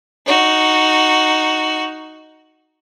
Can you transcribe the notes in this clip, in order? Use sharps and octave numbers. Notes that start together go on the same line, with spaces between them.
D#4 F#4